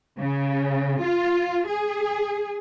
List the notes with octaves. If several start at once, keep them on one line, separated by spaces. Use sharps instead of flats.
C#3
F4
G#4